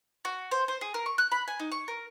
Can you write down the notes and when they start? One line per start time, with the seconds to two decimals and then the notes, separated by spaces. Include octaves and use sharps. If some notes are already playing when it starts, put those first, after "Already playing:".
0.25 F#4
0.51 C5
0.68 C5
0.81 G#4
0.94 A#4
1.06 C#6
1.18 F#6
1.32 B5
1.48 G#5
1.60 D#4
1.72 C#6
1.88 A#4